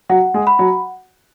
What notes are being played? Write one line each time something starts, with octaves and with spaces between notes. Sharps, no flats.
F#3 F#4 F#5
G#3 G#4
B5
F#3 F#4